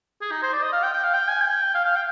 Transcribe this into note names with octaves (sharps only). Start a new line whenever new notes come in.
G#4
D#4
C5
D5
D#5
F5
G5
G5
F5
G5
G#5
G5
F5
F5
G5